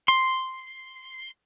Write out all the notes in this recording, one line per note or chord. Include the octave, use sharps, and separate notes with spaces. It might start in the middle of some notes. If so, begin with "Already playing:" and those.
C6